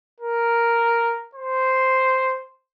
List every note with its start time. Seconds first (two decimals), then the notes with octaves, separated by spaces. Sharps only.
0.20 A#4
1.35 C5